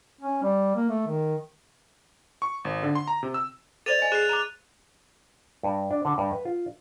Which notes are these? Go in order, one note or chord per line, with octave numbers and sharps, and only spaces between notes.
C#4
G3
A#3
A3
D#3
C#6
G#1
D3
C6
A#5
C3
E6
A4 C5 D5 A6 D#7 F7
D#5 G#5
G#4 F#6 C7
A#5 D6
G2
D4
D3
G2
B4
F4